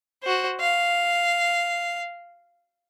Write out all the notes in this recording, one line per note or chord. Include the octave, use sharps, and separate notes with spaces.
F#4 C5
F5